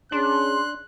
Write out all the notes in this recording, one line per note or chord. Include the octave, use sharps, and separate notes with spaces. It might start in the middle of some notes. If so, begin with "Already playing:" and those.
C#4 D4 G#4 C6 F#6